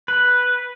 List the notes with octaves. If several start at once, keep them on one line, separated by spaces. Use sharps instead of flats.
B4